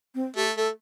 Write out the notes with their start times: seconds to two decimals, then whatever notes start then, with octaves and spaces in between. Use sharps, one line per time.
0.15 C4
0.36 A3 G4
0.57 A3 A4